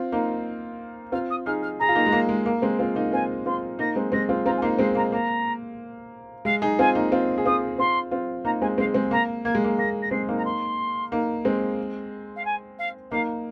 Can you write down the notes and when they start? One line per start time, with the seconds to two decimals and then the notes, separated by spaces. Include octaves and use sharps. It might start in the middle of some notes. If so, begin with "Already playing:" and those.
Already playing: C4 F4
0.12 A#3 D#4
1.12 C4 F4 F6
1.30 D#6
1.46 D#4 G#4 F6
1.62 F6
1.79 G#4 A#5
1.89 F4
1.95 A#3 D#4
2.06 G#3
2.12 A#3
2.29 G#3
2.46 A#3
2.62 G#3 C4
2.79 C4 F4
2.95 A#3 D#4
3.12 C4 F4 G#5
3.46 C4 F4 C6
3.79 A#3 D#4 A#6
3.96 G#3 C4
4.12 G#3 C4 A#6
4.29 C4 F4
4.45 C4 F4 A#5
4.57 G#5
4.62 A#3 D#4 F5
4.79 G#3 C4 F5
4.95 A#3 A#5
5.12 A#3 A#5
6.45 G#3 F5
6.62 D#4 G#4
6.79 C4 F4 G#5
6.95 A#3 D#4
7.12 C4 F4
7.38 G#4
7.45 C4 F4 D#6
7.78 C4 F4 C6
8.11 C4 F4
8.45 A#3 D#4 A#5
8.61 G#3 C4 G#5
8.78 G#3 C4 F5
8.94 G#3 C4
9.11 A#3 A#5
9.45 A#3 G#6
9.55 G#3
9.64 A#3
9.78 A#3 A#6
10.02 A#6
10.11 G#3 C4 C7
10.29 A#3 D#4
10.37 A#5
10.44 C6
11.12 A#3 D#4
11.45 G#3 C4
12.36 F5
12.45 G#5
12.78 F5
13.10 A#3 D#4 F5